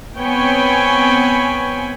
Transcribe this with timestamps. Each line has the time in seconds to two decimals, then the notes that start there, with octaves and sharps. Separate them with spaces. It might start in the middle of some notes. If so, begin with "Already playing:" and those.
0.18 B3 C4 C#5 G5 G#5 B5